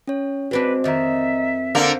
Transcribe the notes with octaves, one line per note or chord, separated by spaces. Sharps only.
C#4 C#5
G#3 C4 D4 F#4 B4
F2 D#3 D#5 E5 A#5
D3 A#3 A#4 C5 F5